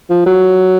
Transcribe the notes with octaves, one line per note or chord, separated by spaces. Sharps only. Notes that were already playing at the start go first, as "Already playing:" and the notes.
F3
F#3